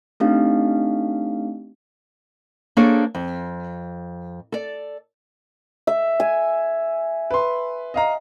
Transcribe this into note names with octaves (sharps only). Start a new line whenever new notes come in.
A3 C4 D4 D#4 G4 F5
A#3 D4 G#4 A4 C5 C#5
F2
A4 D5
E5
G#5
B4 C6
D#5 F5 A#5